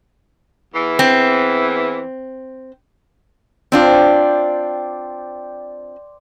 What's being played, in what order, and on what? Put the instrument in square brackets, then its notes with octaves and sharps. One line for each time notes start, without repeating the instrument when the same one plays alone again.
[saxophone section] E2 E3
[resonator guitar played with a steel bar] C4
[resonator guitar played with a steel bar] C4 D4 F4 [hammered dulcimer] C5 D5 G5